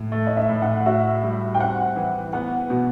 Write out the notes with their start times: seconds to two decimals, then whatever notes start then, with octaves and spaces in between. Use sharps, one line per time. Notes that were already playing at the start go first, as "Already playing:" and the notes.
Already playing: A2
0.12 A3
0.27 D#5
0.37 E5
0.49 A2
0.62 F#5
0.86 F#4 E5
1.23 G3
1.54 G5
1.59 C4 F#5
1.96 E3
2.33 B3 F#5
2.70 B2